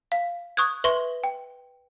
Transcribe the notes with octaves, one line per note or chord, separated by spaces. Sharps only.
F5
C#6 D#6 F#6 G#6
B4 E5 C6 C#6 A#6
G5